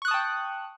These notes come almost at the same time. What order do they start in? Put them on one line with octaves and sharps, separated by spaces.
C#6 F#6 D#6 A5 G5